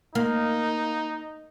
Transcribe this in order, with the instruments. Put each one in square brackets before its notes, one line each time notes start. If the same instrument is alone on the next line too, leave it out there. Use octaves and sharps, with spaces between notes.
[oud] A#3 [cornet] D#4